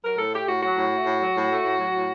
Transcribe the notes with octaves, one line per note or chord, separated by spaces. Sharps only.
F#3 A#4
A2 A4
A3 G4
A2 F#4
F#3 F#4
A2
A3
A2
F#3
A2
A3
A2
F#3
A2